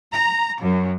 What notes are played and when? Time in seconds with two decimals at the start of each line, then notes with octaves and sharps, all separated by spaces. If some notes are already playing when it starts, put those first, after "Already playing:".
0.11 A#5
0.60 F#2